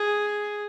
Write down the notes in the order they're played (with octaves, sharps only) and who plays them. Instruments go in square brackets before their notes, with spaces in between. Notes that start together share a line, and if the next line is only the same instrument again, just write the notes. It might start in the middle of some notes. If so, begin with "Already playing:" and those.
Already playing: [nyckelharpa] G#4